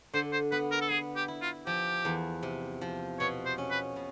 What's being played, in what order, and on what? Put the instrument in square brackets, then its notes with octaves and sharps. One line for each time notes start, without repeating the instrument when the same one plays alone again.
[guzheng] D3 [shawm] C5
[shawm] C5
[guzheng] B3 [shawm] B4
[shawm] A#4
A4
[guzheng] B3 [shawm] G#4
[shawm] G4
[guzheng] E4
[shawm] F4
[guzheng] F3 [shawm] G4
[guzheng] E2
C3
F3
[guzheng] B2 [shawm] C#5
[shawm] C5
[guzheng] C#4
[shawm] B4
[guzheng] B2